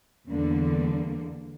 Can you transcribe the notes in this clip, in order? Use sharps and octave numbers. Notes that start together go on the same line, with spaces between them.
E2 D3 G3 A#3